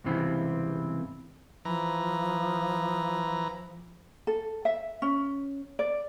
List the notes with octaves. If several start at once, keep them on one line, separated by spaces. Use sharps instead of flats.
C#2 G2 C3 E3 C4
E3 F3 A#5
A4
E5
C#4
D5